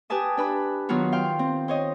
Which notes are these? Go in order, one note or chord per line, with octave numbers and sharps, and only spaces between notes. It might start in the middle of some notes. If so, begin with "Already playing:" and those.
G4 B4 G#5 A5 D#6
D4 B4 B5
D#3 F#3 B3 F4 F#4
F5 G5 C6
C4
C5 C#5 D#5